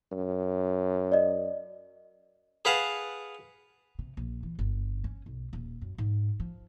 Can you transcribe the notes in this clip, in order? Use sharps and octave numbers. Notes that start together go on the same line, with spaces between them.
F#2
D5 D#5
G#4 B4 F5 F#5 A5
C3
A#1
E3
G1
C#4
B1
D#1
F#2
G#2
F3